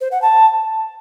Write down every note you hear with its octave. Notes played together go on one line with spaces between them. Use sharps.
C5
F#5
A5